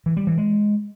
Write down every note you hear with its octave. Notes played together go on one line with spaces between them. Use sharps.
E3
G3
E3
G#3